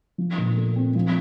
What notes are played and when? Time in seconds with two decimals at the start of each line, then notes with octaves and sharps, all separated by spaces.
0.18 F3
0.38 A#2
0.56 A3
0.76 C4
0.95 F3